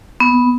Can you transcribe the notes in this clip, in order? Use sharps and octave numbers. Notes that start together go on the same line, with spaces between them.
B3